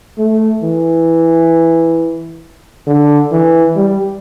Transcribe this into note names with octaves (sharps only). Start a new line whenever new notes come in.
A3
E3
D3
E3
G3